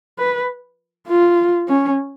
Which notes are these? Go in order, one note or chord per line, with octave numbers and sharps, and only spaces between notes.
B4
F4
C#4